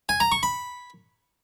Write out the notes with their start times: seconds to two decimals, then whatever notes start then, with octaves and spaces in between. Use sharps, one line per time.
0.09 G#5
0.20 A#5
0.32 C#6
0.43 B5